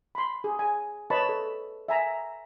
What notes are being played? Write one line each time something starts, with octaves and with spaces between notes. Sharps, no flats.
B5 C6
G#4
G#5
B4 C#5 D#5 A5 B5 C#6
A4
E5 G#5 A#5